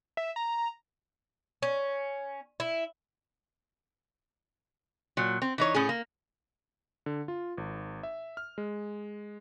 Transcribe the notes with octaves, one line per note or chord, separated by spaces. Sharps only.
E5
A#5
C#4
E4
A#2 F#3
C4
E3 D#4 C#5
A2 C#4 G#4
A#3
D3
F4
G#1
E5
F6
G#3